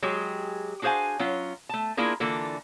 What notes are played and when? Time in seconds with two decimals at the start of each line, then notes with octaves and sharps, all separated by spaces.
0.02 F#3 G#3 G4 G#4
0.82 D4 F#4 G#4 C5 F5 G#5
1.19 F#3 C#4 F4
1.69 A3 A5
1.97 A#3 D4 E4 F4 G#4 A#4
2.20 D3 E3 A#3 F4 A4